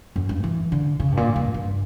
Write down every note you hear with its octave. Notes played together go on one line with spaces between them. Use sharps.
F#2
G2
E3
D3
C#3
G2
A#2
G2
G2